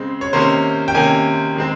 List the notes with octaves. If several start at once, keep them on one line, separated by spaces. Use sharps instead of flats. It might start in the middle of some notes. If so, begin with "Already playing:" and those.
Already playing: C#3 G#3 C4
C#5
C3 D#3 A#3 C#4 C5
G5
C3 D#3 A#3 C#4 G#5
D#3 G#3 C4